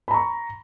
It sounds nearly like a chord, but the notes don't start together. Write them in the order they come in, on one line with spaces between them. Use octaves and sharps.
B5 A#5 C#6